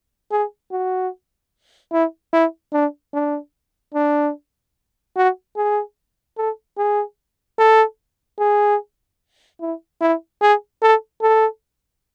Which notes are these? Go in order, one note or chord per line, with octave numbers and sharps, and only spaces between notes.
G#4
F#4
E4
E4
D4
D4
D4
F#4
G#4
A4
G#4
A4
G#4
E4
E4
G#4
A4
A4